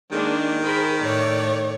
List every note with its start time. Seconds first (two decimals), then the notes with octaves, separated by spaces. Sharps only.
0.12 D#3 G#3 A#3 D4
0.64 G#4 A#4 C5 B5
1.01 A2 A3 C#5 D5